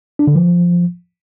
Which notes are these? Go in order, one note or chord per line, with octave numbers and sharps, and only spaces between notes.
D4
D3
F3